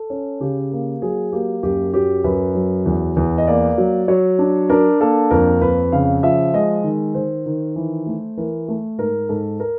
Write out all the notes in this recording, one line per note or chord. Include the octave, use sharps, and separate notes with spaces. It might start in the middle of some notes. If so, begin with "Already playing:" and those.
Already playing: A4
C#4
C#3 G4
A#3
F#3 G#4
A#3 G4
F#2 G4
F#3 G4
F#2 B4
F#3
E2
E2
D#5
A#3 D5
F#3
F#3 C#5
D4
D4 A#4
A#3 A4
F2 A#4
F2 B4
C#3 F5
F3 E5
G#3 D#5
D#3
D#3 C5
D#3
E3
A3
E3 A#4
A3
G#2 A#4
G#2 A4
A#4